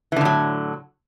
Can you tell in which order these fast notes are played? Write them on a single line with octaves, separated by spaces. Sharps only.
E3 D3 A2 F#3